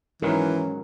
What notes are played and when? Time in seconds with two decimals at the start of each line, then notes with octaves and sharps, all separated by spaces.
0.22 G#2 D#3 E3 F#3 C#4 A#4